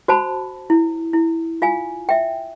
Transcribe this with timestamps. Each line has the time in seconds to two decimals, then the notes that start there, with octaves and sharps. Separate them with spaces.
0.08 F#4 C5 A5 B5
0.70 E4
1.13 E4
1.62 F4 F5 G#5
2.09 E5 G5